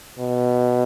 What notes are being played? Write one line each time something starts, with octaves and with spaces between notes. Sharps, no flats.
B2